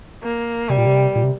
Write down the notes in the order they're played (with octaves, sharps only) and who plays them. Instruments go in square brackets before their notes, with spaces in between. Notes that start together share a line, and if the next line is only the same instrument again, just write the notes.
[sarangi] A#3
[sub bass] C3 [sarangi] G3
[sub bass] A#2
C3
A#2
C3